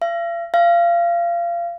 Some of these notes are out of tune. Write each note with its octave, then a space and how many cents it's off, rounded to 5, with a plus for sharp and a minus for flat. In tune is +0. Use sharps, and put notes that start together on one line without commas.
F5 -45
F5 -25